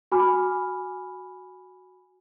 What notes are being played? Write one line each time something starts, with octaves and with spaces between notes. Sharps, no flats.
F#4 G#5 B5 D6 F6